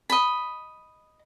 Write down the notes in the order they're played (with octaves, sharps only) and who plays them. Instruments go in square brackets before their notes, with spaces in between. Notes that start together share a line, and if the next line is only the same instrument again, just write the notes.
[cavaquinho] D#5 B5